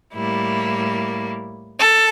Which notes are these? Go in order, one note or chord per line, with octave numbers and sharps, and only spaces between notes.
A2 G3 A#3 E4
A4